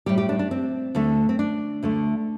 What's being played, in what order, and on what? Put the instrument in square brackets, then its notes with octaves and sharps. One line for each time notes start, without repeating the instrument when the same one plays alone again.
[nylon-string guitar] A2 G3 G4
G4
D4
D4
C4
D2 D3 A3
C4
D4
D2 D3 A3